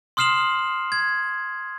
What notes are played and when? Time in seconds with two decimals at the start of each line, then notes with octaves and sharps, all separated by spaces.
0.17 C6 D#6 F6 C7 E7 F#7
0.92 G#6